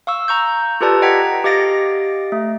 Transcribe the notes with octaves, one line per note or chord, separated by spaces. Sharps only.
F5 C#6 E6
A#5 C#6 G6
F4 G4 A4 B4 D5 A5
D#5 F#5 G5 A#5 G#6 B6
G4 D#5 F5 A6 A#6 D7
A3